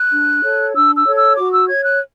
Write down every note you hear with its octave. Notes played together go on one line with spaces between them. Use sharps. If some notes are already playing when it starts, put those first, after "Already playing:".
Already playing: F#6
D4
A4 C#5
D4 E6
E6
A4 C#5
E6
F#4 D6
E6
C#5 G#6
F#6